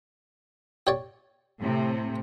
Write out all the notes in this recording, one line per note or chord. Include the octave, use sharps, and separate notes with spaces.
G4 C#5 D5
A2 C3